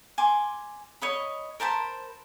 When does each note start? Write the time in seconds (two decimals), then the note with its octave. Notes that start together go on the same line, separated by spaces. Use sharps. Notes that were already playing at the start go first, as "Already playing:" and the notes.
0.18 G#5 C6 D6
1.02 C#5 D#5 B5
1.60 A#4 C5 A5 B5